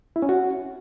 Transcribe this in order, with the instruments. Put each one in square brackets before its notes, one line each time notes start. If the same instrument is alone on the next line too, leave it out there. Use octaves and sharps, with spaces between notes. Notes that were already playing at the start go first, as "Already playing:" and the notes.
[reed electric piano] E4
C#4
F#4